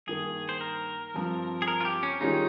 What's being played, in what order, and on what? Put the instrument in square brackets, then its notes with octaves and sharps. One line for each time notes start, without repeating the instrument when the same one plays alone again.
[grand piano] G2 D#3 A#3 [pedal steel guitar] G#4
[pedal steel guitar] C5
A#4
[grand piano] G2 F3 C4
[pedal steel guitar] G#4
A#4
F4
G4
C#4
[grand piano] D#3 G3 C#4 F4 G#4 [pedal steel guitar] D#4